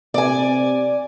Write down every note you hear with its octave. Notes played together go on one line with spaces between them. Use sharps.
C3 D5 G#5